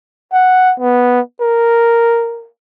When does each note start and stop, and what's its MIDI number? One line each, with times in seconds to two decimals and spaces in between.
0.33 0.74 78
0.80 1.20 59
1.41 2.49 70